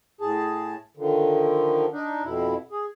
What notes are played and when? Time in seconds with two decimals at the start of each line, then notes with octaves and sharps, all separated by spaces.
0.21 A2 G#4 A5
0.97 D3 D#3 F3
1.92 D4 D#4
2.23 F2 B2 E4
2.71 G#4